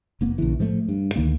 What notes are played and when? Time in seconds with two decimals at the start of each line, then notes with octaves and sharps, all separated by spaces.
0.21 F1 A#3 B3
0.38 A#1 C#3 E3
0.59 A2 F3 G3 A3
0.88 G2
1.16 D2 D#3 A#3